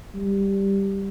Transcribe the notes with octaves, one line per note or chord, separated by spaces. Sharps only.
G3